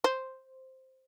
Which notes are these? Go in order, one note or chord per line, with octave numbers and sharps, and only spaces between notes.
C5